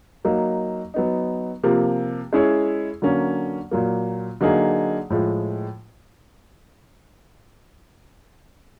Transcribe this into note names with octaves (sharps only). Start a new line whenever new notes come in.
F#3 A#3 D#4
F#3 B3 D#4
C3 F3 A#3
G#3 C#4 E4 G#4 C#5
D3 F#3 A#3 C#4
A#2 F#3 A#3
D3 F#3 A#3 D#4 G#4
A2 F3 G#3